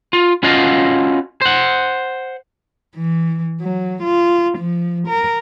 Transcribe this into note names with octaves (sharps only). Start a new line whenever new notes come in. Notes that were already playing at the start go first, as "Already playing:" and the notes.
F4
C#4 F4 F#4 D#5 F5 A5
C5 F#5
E3
F#3
F4
F3
A#4